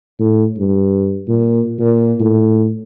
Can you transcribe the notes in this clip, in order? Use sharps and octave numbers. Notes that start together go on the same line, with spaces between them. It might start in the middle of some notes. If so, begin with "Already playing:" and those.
A2
G2
A#2
A#2
A2